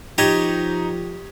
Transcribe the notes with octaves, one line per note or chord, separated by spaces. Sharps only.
F3 D#4 G4 C#5 D#5 G#6